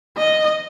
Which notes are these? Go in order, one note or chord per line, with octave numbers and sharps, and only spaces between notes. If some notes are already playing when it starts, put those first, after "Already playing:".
D#5